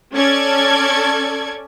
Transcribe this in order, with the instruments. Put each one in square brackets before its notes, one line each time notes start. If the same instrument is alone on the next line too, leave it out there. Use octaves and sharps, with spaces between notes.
[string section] C#4 A4 D5 G#6